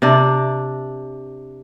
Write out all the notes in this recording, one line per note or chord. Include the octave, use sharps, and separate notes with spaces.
C3 D4